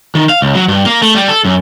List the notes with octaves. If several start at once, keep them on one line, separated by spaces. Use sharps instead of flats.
D#3
F5
C#2
F#3
G2
A#3
A3
G3
A4
F#2